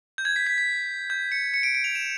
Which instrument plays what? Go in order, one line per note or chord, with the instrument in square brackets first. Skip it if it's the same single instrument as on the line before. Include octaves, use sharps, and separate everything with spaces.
[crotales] G6
G#6
B6
B6
B6
G6
C#7
C#7
D7
D7
F7
E7